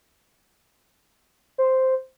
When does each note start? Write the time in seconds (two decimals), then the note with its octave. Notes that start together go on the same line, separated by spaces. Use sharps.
1.58 C5